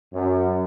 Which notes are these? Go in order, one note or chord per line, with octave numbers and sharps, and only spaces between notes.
F#2